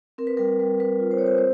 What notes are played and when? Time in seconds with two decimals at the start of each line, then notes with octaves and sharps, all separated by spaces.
0.18 C4 A#4
0.27 B4
0.37 G3 A#4
0.60 G3
0.80 G3 B4
1.00 F4
1.11 C5
1.18 C#5
1.22 C4 C5
1.38 C5